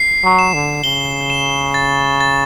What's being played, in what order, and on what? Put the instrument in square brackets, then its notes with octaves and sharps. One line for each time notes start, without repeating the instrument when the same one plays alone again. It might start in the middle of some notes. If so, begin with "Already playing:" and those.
Already playing: [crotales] C7
[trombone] F#3
[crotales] E7
[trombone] D3
[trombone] C#3 [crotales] G7
[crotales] E7
A6
A6